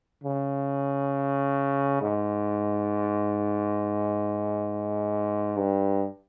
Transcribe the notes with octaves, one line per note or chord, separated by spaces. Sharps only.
C#3
G#2
G2